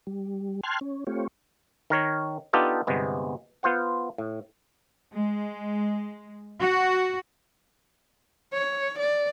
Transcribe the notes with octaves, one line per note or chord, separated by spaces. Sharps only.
G3
G5 A5 C6 F6 F#6 G#6
C#4
A3 C4 F4 G4 C#5
D#3 A#4 C#5
B3 D4 D#4 F4 G4 A4
G1 C3 G#3 B3
B3 F4 C5 F#5
A2
G#3
F#4
C#5
D5